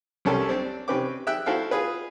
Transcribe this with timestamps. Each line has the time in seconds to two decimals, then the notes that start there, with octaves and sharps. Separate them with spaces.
0.25 C2 G3 C#4 G4 A4 A#4
0.49 C4 D4 D5
0.88 C3 C4 C#4 B4 G5 D6
1.27 E5 G5 E6 F#6
1.46 E4 F#4 A4 C5 F5 G5
1.71 F4 G#4 B4